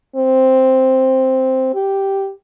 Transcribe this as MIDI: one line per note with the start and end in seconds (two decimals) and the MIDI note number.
0.16 1.73 60
1.75 2.32 67